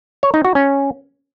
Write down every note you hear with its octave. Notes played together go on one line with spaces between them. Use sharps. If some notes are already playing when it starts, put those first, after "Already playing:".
C#5
D#4
F#4
C#4